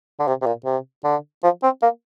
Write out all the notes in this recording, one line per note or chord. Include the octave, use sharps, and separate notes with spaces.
D3
C3
C3
A#2
C3
D3
F3
C4
A#3